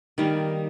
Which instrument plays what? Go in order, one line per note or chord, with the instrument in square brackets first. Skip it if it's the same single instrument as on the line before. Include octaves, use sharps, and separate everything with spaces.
[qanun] D#3 G3 A#3